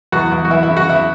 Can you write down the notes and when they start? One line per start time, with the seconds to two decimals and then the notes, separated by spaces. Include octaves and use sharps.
0.12 E2 F#4
0.32 E2
0.45 F#4
0.50 E3 E4
0.63 E4
0.70 C#3
0.77 F#4
0.89 E2 E4